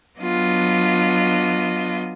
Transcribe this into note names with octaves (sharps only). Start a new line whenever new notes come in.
F#3 B3 D4 F4 D#5